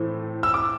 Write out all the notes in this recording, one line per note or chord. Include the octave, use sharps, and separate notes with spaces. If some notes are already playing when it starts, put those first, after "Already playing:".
Already playing: A2 E3 A3 C4
E6
D6